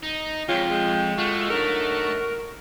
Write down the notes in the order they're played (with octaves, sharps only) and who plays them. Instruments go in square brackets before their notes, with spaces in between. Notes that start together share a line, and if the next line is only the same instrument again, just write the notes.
[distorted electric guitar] D#4
[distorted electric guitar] F2 [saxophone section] G#3 C#5 [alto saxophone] F4 [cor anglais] G5
[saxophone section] G#3
[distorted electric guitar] A3 [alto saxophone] F4 [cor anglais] F#4
[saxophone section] D3 F#3 D#4 [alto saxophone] A#4